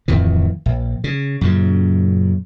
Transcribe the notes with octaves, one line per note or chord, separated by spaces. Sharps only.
D1 F2 D#3 E3
A#1
C#3
F#2 A#2 C#3